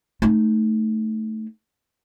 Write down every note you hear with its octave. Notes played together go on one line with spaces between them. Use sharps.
A3 D#4